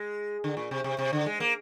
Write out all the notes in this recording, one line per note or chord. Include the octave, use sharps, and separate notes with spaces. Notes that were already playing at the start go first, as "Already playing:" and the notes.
Already playing: G#3
D3
A#2
C3
C3
C3
D3
G#3
A#3